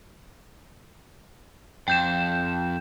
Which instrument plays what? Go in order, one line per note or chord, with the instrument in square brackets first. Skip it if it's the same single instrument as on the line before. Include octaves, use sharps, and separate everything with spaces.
[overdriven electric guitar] F2 [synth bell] G5 G6 E7